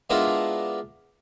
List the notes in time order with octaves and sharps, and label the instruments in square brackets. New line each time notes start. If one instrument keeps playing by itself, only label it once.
[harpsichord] G#3 B3 D4 E4 F4 A#4